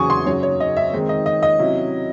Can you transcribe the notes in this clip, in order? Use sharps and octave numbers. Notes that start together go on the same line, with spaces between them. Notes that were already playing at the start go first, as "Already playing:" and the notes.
Already playing: E2 C#3 F#3 G#5 C#6 D#6
C6
F#2 C#3 F#3 C#5
C#5
D#5
E5
D#3 G#3 C4 D#4
D#5
D#5
D#5
C3 F#3 C#4 E4